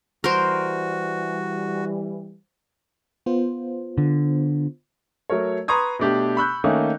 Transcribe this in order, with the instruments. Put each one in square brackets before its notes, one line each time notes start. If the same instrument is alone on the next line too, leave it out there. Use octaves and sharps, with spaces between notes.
[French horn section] E3 G3 [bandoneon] F#4 [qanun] A#4 C5
[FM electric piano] B3 F4 C5
[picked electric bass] D3
[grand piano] F#3 A3 A#4 C#5
B4 A#5 C6 C#6 D#6 G#6
B2 A3 D4 G4
B5 C#6 E6 F#6 G6
D#3 A3 A#3 C#4 D#4